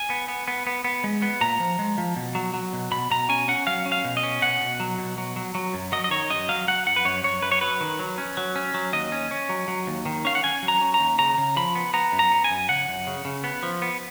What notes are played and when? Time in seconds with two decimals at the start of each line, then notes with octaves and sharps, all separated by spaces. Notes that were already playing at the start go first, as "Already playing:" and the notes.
Already playing: G#5
0.10 B3
0.28 B3
0.48 B3
0.67 B3
0.84 B3
1.04 G#3
1.22 B3
1.41 A#2 A#5
1.60 F3
1.79 G#3
1.98 F3
2.16 B2
2.35 F#3
2.54 F#3
2.73 B2
2.91 B2 B5
3.10 B2 A#5
3.29 C#4 G#5
3.48 C#4 F#5
3.67 F#3 F5
3.86 C#4
3.92 F5
4.05 B2
4.17 D#5
4.23 C#4
4.42 B2 F#5
4.61 B2
4.80 F#3
4.99 B2
5.18 F#3
5.36 F#3
5.55 F#3
5.74 F#2
5.92 F#3 D#5
6.04 D#5
6.11 D#3 C#5
6.30 F#2 D#5
6.49 F#3 F5
6.67 F#3 F#5
6.86 F#2 F#5
6.96 B4
7.05 F#2 C#5
7.24 F#2 C#5
7.42 F#2 B4
7.52 C#5
7.61 F#3 B4
7.81 D#3
7.99 F#3
8.18 C#4
8.37 F#3
8.56 C#4
8.74 F#3
8.93 D#2 D#5
9.12 C#4
9.31 C#4
9.49 F#3
9.68 F#3
9.87 D#2
10.06 D#3
10.25 C#4 F5
10.35 F#5
10.43 C#4 G#5
10.63 F#3
10.68 A#5
10.81 C#4
10.94 A#5
11.00 D#2
11.19 C#3 A#5
11.38 C#3
11.56 F3 B5
11.75 B3
11.94 B3 A#5
12.12 F#2
12.19 A#5
12.32 B3
12.44 G#5
12.51 F#2
12.69 C#3 F#5
12.88 F#2
13.07 C#3
13.25 C#3
13.44 B3
13.63 F3
13.82 B3